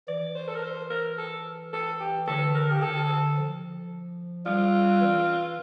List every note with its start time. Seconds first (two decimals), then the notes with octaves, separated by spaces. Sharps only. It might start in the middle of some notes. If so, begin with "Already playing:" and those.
0.08 E3 D5
0.35 C5
0.48 A4
0.54 A#4
0.62 C5
0.90 A#4
1.18 A4
1.73 A4
2.00 G4
2.27 D3 A4
2.54 A#4
2.70 G4
2.82 D3 A4
3.37 F3
4.46 G3 F4
5.01 E3